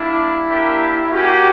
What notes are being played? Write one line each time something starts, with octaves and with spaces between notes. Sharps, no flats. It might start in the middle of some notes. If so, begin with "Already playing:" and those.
Already playing: G3 A#3 D4 E4
A#3 D4 G4 A#4 E5
A#3 C#4 F#4 G4